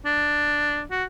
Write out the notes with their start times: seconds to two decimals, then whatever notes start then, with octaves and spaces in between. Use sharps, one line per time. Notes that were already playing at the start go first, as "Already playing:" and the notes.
0.06 D4
0.91 F#4